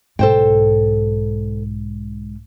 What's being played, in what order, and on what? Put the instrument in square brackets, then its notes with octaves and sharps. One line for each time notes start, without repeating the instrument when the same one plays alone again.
[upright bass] B1 G#2 [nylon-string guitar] A4 C5 G5